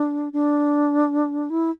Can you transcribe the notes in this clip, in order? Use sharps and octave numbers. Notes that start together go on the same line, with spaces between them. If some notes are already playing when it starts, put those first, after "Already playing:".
Already playing: D4
D4
E4